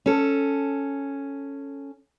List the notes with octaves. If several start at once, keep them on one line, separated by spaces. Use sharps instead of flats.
C#4 A4